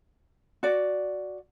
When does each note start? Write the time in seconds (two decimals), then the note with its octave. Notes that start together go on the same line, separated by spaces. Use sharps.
0.63 F#4 D5